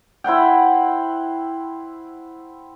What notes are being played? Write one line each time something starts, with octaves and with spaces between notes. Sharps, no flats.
E4 C5 F#5 G5